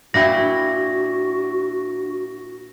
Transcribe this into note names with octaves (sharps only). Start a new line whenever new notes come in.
A#2 D4 E4 F#4 G5 A#6